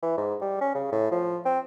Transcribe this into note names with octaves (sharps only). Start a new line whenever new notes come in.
E3
G#2
G3
C#4
C#3
A2
F3
C4